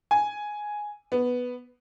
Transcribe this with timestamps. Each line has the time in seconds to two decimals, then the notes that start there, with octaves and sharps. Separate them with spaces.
0.11 G#5
1.12 B3